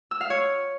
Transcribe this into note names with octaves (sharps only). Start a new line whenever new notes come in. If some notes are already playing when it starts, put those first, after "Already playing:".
E6
F5
C#5